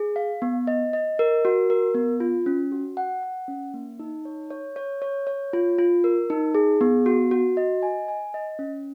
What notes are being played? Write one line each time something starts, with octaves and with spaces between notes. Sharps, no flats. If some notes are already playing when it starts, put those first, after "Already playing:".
Already playing: G#4
F5
B3
D#5
D#5
A#4
F#4
A#4
B3
F4
C#4
F#4
F#5
F#5
C#4
A#3
D#4
C#5
C#5
C#5
C#5
C#5
F4
F4
A#4
D#4
G#4
B3
F#4
F#4
D#5
G#5
G#5
D#5
C#4